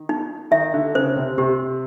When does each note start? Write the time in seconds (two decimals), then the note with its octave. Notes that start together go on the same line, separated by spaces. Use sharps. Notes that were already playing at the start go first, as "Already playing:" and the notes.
Already playing: D#3
0.09 D#4
0.51 D#3 E5
0.74 D3
0.95 C#3 C5
1.16 C3
1.38 C3 G4